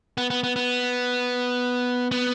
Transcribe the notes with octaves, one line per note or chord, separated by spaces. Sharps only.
B3
B3
B3
B3
B3